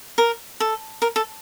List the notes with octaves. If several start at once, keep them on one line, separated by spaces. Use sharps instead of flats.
A#4
A4
A#4
A4